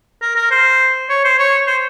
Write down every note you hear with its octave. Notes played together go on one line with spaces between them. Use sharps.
A#4
A#4
C5
C#5
C5
C#5
C5